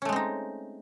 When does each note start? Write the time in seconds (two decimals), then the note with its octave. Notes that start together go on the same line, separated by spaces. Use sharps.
0.02 C#4
0.05 A3
0.09 G#3
0.12 C4
0.16 D#4